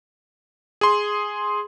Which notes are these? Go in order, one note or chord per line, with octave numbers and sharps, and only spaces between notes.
G#4 C6